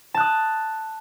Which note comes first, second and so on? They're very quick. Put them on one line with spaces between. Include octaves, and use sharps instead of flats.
A5 F#6 D#6